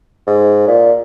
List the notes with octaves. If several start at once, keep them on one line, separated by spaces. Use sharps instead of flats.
G#2
A#2